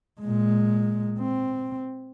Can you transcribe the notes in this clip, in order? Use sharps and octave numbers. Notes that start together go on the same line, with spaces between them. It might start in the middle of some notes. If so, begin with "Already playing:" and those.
A#2 G#3
C4